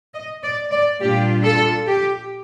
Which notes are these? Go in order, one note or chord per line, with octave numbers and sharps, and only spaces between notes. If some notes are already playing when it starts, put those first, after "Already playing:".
D#5
D5
D5
A#2 G3 D4 F4 G4
A4
G4